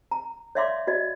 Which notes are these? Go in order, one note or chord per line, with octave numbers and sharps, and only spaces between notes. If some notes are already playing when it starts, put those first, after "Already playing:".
A#5
C#5 D5 E5 F5 C6 D6
F#4 D5 D#5